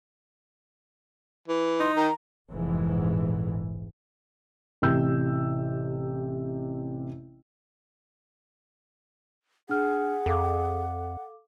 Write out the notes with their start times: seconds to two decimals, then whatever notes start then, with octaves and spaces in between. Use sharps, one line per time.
1.48 E3
1.80 D#4 C6
1.97 D#3 A#5
2.50 F1 A#1 G#2 E3
4.82 A1 C3 E6 G6
9.69 D4 G#4 F#5 F6
10.26 F2 A4 F5 D6